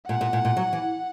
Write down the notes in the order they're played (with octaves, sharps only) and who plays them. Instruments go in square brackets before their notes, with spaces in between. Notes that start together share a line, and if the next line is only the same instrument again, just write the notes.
[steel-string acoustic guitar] A#2 [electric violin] F#5
[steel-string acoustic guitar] A#2
A#2
A#2
F#3
E3